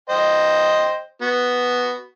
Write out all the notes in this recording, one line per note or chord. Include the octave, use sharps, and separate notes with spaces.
C5 D#5 G5
B3 F#4